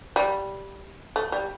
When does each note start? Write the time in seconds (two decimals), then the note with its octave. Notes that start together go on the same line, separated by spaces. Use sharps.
0.16 G3
1.16 A3
1.32 G3